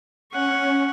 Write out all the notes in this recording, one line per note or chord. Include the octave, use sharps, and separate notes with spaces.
C#4 F#5 C#6